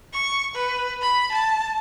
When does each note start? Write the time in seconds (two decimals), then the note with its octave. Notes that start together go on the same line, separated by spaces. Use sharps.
0.14 C#6
0.55 B4
1.02 B5
1.32 A5